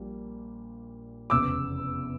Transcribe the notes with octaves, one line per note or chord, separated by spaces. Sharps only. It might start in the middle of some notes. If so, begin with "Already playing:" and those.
Already playing: A#1 A#2 G3 A#3
F1 E2 C#3 D6 E6